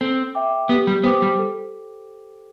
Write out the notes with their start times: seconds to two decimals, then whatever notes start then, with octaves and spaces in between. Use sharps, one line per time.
0.01 C4 A4
0.35 E5 G5 D6
0.69 B3 G4
0.87 G3
1.04 B3 C5 G5 D6
1.22 G3
1.39 A4